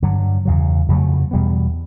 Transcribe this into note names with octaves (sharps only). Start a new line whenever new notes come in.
G2 D3 F#3
E2 C#3 F#3
F2 C#3 F#3 A3
E2 B2 G3 B3